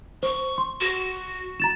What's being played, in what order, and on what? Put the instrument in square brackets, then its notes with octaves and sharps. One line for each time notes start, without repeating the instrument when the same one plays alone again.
[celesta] C5 [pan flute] C#6
[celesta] C6
[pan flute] F#4
[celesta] A#5 A6 E7